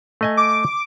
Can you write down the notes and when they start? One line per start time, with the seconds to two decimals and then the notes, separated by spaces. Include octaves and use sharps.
0.21 A3 D#5 G#5
0.37 D6